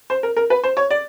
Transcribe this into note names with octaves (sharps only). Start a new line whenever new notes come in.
C5
A#4
A#4
B4
C5
C#5
D5